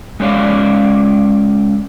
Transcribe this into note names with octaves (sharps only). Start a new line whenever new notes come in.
G#3 A3 C#4 C#5 D5 F5